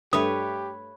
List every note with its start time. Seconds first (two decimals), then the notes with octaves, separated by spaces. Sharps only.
0.13 G2 A3 G4 B4 C#5 D#6